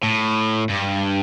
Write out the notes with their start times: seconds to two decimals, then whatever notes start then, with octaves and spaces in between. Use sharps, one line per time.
0.04 A2
0.70 G2